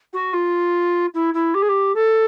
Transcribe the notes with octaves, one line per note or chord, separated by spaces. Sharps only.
F#4
F4
E4
E4
G4
G#4
G4
A4